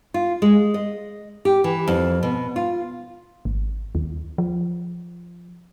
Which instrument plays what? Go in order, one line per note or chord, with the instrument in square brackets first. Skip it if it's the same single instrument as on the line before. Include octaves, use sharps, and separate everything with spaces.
[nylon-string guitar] F4
G#3
D#5
G4
E3
F2
B2
F4
[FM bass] G#1
D#2
F3